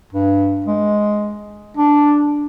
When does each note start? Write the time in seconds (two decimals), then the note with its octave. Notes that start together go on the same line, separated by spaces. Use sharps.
0.13 G2
0.66 G#3
1.77 D4